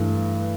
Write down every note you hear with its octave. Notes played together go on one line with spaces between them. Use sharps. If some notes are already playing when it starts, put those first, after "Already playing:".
Already playing: G2 E3 A3